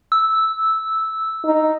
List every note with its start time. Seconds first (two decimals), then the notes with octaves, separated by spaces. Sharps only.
0.12 E6
1.45 D#4